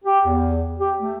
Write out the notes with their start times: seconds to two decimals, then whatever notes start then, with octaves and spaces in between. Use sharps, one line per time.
0.05 G4
0.25 E2
0.80 G4
1.01 A3